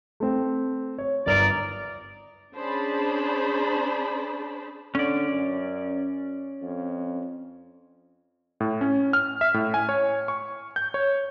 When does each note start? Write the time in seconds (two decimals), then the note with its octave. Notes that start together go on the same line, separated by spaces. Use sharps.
0.20 A3 C4
0.98 C#5
1.26 G1 D#4 A#4 D5
2.56 C#4 D4 G#4 C5 A5 B5
4.95 D3 C#4 D5
5.31 F#2
6.62 F2
8.60 A2
8.81 C#4
9.13 F6
9.41 E5
9.54 A2
9.74 G#5
9.89 C#5
10.28 C#6
10.76 G6
10.94 C#5